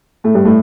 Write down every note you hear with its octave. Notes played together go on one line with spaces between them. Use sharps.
A2 A3
G2 G3
A2 A3